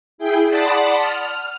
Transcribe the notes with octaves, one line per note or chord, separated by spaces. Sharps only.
E4 G#4 G5
D5 F#5 A5 B5 C6 D#6
F6